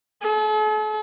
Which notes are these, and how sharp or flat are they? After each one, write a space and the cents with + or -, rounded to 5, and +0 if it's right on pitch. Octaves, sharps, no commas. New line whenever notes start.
A4 -45